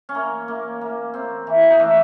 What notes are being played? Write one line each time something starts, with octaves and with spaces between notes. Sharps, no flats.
C#4
A#3
A#3
A#3
C4
E3
D#4
A3 D4